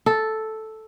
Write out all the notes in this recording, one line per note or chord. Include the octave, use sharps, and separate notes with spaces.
A4